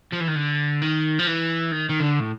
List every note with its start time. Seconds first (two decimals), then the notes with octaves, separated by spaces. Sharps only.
0.12 F3
0.20 E3
0.28 D#3
0.35 D3
0.82 D#3
1.19 F3
1.27 E3
1.72 D#3
1.90 D#3
2.01 D3
2.20 A2